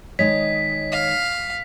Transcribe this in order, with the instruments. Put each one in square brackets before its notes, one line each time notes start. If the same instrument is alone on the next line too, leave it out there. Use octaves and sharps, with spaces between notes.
[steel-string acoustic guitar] D#3 G#3 D#5 [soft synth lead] C#5 [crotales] B6
[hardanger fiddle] F5